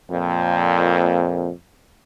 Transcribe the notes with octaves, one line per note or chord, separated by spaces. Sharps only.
F2 A#2